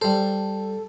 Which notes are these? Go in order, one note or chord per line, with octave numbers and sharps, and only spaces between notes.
G3 A4 C5